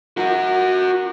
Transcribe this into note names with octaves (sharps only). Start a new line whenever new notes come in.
F#4 A#4